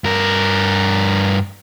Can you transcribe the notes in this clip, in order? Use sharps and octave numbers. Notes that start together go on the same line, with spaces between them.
G2 A#4